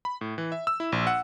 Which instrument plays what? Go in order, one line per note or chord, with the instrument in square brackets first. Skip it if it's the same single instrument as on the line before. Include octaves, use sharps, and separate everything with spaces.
[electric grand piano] B5
A2
E3
E5
E6
E4
A#1
F#5